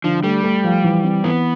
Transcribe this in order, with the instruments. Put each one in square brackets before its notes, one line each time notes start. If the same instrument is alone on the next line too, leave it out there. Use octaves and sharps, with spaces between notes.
[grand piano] D3 [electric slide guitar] F3
[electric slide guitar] G3 [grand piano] A3
[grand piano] A3
F3
E3
C4
[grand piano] E3 [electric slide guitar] B3